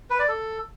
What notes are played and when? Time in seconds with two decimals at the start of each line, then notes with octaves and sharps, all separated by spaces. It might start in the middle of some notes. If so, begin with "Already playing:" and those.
0.10 B4
0.19 D5
0.28 A4